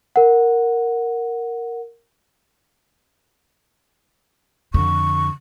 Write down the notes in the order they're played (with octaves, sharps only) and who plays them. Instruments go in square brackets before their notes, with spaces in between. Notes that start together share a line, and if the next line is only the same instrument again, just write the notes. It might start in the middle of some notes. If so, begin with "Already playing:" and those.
[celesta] A#4 F#5
[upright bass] F2 D3 [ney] C#6